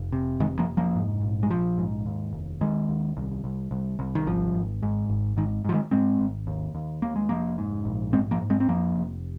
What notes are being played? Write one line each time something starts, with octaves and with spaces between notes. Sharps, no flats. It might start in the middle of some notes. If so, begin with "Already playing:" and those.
Already playing: F1
C3
F1 D#3 G#3
F3 A#3
F1
F3 A#3
G#2
A#1
G#3
A#1 F3
G#2
D#2
F1
D#2 D#3 G#3
D#2
C2
C2
C2
C2
D#3
G#1 F3
G#1
G#2
G#1
G#2 D#3
G#2
F3
D#3 G#3
G#2 G#3 C4
G#1
D#2
D#2
D#2 A#3
G#3
F1 F3 A#3
G#2
A#1
G#2 G#3 C4
F3 A#3
G#2
G#3 C4
C4
F2 F3 A#3
F1